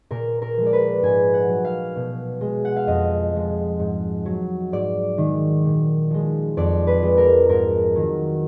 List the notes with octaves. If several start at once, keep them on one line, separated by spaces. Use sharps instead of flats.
A#2 A#4
A#4
F3 G#3
D5
B4
G#2 G#5
F#5
F#3
F5
B2
G#3
F#5
F5
F2 D#5
F3 G#3
G#2
F#3
G#2 D5
D#3 G#3
A#2
F3 G#3
F2 D5
B4
F3 G#3
A#4
G#2 A#4
D#3 F#3